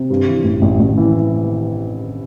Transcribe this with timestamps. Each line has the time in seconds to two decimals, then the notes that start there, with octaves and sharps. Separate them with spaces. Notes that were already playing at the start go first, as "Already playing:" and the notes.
Already playing: C3
0.10 G2
0.27 E3
0.44 A1
0.62 A1
0.79 A1
0.98 E3